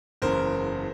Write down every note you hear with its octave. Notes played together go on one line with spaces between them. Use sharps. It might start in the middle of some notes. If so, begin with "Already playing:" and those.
F#1 E2 C#3 A#4 C5